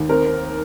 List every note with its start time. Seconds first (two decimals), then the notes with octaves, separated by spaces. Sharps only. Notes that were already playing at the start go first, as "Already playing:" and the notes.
Already playing: D#2
0.09 C4 A#4
0.26 C4